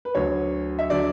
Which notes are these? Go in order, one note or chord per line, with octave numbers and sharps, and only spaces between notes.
B4
D2 D3 F#3 C#5
E5
D3 F#3 D5